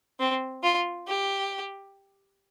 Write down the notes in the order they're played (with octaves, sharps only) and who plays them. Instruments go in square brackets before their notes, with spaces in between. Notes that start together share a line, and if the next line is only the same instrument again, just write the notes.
[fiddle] C4
F4
G4